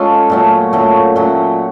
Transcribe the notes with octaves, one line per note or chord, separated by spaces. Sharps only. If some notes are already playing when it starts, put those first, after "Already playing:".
Already playing: G#3 C#4 F4 A4
A#2 F#3 A3 C#4
A#2 F#3 A3 C#4
A#2 F#3 A3 C#4